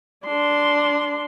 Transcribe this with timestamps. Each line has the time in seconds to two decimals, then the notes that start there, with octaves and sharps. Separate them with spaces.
0.25 D4 C6